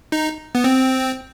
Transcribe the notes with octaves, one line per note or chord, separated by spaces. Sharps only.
D#4
B3
C4